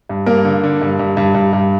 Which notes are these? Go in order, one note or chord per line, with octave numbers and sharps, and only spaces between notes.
G2
G2 A#3 A#4
D3
D3
G2
G2
G2
G2
G2